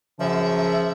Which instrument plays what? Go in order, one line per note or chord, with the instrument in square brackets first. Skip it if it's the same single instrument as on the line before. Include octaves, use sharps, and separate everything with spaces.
[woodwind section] F#2 [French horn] C#3 [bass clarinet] F3 [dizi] E5